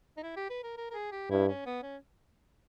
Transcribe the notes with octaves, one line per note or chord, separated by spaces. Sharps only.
D#4
E4
G4
B4
A#4
A#4
A#4
G#4
G4
G2 E4
C#4
B3
C#4